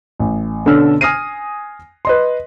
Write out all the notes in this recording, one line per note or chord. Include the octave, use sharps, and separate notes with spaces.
A1
B2 D3 C#4 D4 E6 F6
G#5 D#6 F6 A#6 C7 D#7
B4 D#5 C6